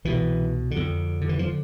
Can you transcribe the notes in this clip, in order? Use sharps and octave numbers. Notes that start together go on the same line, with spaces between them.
C2 B2 E3
D3
F2
D3
E3
D3 F3